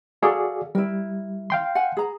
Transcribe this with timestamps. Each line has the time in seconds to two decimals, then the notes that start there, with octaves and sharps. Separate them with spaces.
0.22 F#4 G#4 A4 D5 F5 A#5
0.75 G3 E4 A#4
1.50 F5 G5 C6
1.75 F#5 G#5
1.97 G#4 A#5